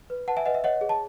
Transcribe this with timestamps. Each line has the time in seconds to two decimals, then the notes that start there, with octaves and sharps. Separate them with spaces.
0.10 B4
0.28 B4 F#5 A5
0.37 E5 G#5
0.45 B4 D#5 F#5
0.54 E5
0.64 C#5 D#5 F#5
0.81 G#4
0.89 A5